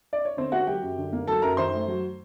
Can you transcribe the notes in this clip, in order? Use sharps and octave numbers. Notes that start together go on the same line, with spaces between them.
D5
C#5
D3 C4 C5
A#3 F#4 F#5
F#3 G4 G5
F#2
D3
A#3
F#3 A4 A5
F#2 A#4 A#5
D#3 C5 C6
A3
F#3